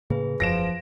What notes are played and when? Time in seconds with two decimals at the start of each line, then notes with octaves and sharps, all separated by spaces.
0.10 A2 C#3 A#3 G#4 B4
0.40 E1 F#2 F3 A#6 D7 E7